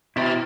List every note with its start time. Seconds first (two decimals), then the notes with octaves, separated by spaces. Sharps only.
0.16 B2 E4